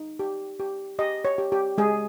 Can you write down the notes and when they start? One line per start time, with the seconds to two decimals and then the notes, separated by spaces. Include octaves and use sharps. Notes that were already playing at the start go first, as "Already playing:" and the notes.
Already playing: D#4
0.19 G4
0.60 G4
0.99 G4 D#5
1.25 C#5
1.38 G4
1.52 G4
1.78 G#3 G#4